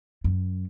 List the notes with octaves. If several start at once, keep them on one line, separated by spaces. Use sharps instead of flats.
F#2